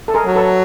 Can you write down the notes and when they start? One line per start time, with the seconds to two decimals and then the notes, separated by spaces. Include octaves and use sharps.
0.08 A4
0.14 G#4 A#4
0.26 F#3
0.36 A4 B4